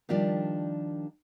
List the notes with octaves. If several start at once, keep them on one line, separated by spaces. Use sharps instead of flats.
D#3 F3 G3 D4 G4 D5